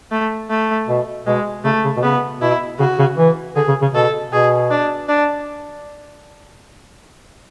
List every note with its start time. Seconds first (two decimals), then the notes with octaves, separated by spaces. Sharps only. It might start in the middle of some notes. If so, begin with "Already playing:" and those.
0.11 A3
0.50 A3
0.88 B2
1.26 B2 G#3
1.64 C#3 A3
1.84 C#3
1.96 B2
2.03 C#3 B3
2.41 B2 E4
2.79 C#3 F#4
2.99 C#3
3.18 E3
3.56 D3 G#4
3.68 C#3
3.81 C#3
3.94 B2 A4
4.32 B2 G#4
4.70 D4
5.09 D4